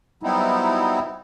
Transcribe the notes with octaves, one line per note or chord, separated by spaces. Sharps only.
F#3 G3 B3 C4 D#4 E4